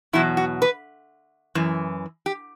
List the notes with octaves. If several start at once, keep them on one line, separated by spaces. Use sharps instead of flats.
E2 B2 F#3 E4
F#4
B4
F#2 E3
G4